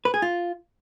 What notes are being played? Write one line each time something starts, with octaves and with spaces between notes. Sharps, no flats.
B4
G#4
F4